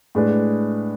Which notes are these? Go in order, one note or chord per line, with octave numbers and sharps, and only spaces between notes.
A2 G#3 D4 G#4 B4